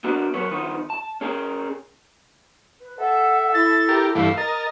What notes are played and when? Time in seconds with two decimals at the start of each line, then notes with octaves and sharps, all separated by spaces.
0.04 B3 D4 F#4 A#4 B4 D5
0.34 F#3 A#4 B4 C#5
0.51 D#3 F3 B3 D#4
0.90 A5
1.21 C#4 G#4 A#4 G5
2.81 B4
3.00 A4 E5 F#5
3.54 E4 A6
3.89 G4 A#4
4.15 G2 E3 A3 F5
4.37 A#4 D#5 A6